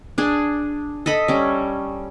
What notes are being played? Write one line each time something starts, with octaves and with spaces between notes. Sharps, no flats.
D4 G#4
A4 D#5 B5
G3 C#4